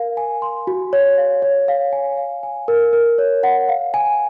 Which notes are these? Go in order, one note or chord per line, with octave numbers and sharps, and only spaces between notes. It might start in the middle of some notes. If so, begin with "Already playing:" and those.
Already playing: A#4 F5
G#5
C6
F#4
C#5
F5
C#5
F5
G#5
F5
G#5
A#4
A#4
C#5
F#5
F5
G#5